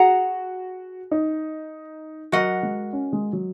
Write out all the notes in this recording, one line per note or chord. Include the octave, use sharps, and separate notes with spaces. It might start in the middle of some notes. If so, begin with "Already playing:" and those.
Already playing: F#4 G#4 F#5 A#5
D#4
F#3 F#4 A#4 D#5 F#5
G#3
C#4
G#3
F#3